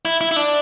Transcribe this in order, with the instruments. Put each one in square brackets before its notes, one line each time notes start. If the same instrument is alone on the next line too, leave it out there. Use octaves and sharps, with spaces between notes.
[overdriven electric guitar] E4
E4
E4
D4